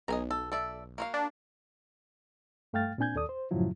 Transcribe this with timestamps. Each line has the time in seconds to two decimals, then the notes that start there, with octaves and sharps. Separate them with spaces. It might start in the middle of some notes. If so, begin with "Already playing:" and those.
0.08 B1 D#5 G#5 A#5
0.31 A4
0.52 A4 D5 E5
0.98 A#3 F#4 F5
1.14 D4
2.73 G2 A3 F5 G5 F6 A6
2.98 A#2 C4 D4 G#5 G6 G#6
3.15 D#2 A4 D5 D#6
3.29 C5
3.51 F#2 A2 C#3 F3 F#3 E4